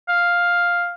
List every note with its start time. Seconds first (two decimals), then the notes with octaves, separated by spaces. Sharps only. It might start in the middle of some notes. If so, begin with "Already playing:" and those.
0.09 F5